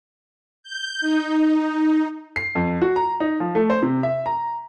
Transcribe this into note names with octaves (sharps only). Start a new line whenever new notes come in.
G6
D#4
C7
F2
F#4
A#5
D#4
F3
A3
C5
C3
E5
A#5